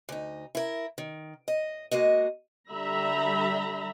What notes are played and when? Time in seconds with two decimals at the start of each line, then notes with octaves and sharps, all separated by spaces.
0.09 D2 D#4
0.55 E4 A#4
0.98 D#3
1.48 D#5
1.91 G#3 A#3 F#4 D#5
2.69 D3 G3 E5 A#5 B5